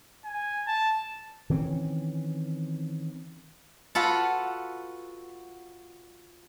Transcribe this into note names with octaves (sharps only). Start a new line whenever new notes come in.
G#5
A5
D#3 E3 C4 C#4
F4 F#4 A4 B4 F#5